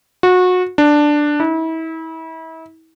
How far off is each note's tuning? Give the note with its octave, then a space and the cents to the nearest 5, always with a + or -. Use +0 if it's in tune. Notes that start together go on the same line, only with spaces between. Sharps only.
F#4 -25
D4 +5
E4 -35